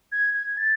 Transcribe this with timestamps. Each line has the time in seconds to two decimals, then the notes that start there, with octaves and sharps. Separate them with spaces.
0.12 G#6
0.34 G#6
0.57 A6